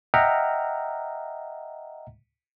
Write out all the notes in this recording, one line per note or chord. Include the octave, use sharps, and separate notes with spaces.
D#5 E5 F#5 G5 A#5 F6